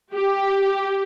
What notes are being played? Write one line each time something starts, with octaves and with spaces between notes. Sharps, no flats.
G4